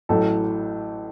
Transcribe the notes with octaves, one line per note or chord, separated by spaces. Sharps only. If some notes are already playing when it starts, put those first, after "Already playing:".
A1 A2 F#3 A4